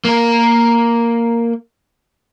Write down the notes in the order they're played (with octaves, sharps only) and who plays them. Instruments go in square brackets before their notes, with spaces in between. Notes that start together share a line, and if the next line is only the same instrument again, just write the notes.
[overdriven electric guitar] A#3 A#4